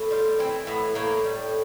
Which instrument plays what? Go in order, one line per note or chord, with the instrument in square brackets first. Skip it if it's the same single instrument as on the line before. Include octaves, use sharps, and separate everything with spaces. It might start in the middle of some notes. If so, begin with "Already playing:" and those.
Already playing: [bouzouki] A2
G3 F4
E3 C4
A2 B3
A2 A#3
G3